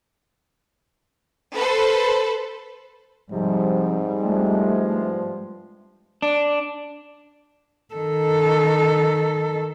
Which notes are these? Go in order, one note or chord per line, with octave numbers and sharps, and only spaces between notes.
A4 B4 C5
G#2 C3 F3 G3 C4
G2 F3 G#3 A3
D4
D#3 A4